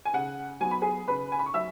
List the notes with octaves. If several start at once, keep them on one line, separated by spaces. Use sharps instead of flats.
G#5
C#3 F#5
F#3 B3 G#5
B5
G#4 G#5
C#3 B4 B5
G#5
B5
C#6
F#3 E5 E6